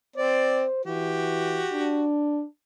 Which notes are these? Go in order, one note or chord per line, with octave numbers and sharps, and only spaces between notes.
C4 C5 D5
E3 F#4 G4
D4